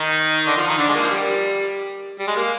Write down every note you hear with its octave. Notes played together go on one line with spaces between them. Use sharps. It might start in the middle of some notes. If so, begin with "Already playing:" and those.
Already playing: D#3 D#4
D3 D4
F3 F4
D#3 D#4
D3 D4
G#3
A#3
F3
G3
G3
G#3
A#3